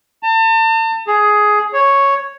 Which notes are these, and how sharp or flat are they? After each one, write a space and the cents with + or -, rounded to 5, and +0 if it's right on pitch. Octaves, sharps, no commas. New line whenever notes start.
A5 +40
G#4 +10
C#5 +0